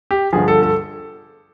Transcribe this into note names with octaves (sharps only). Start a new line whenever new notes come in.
G4
G1 G2 D3 F3 G#4
A4
A4